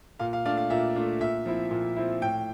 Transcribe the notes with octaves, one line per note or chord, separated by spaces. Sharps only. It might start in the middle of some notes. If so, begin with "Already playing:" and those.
A#2 F5
F5
A3 D4 F4 F5
F5
A#2 E5
A3 D4 F4
A#2 E5
F3 C4 E4
A#2
F3 C4 E4
A2 G5